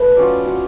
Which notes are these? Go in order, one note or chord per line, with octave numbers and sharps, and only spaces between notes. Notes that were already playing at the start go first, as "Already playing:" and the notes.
Already playing: A3 B4
F#3 C#4 F4 D5
F#3 C#4 F4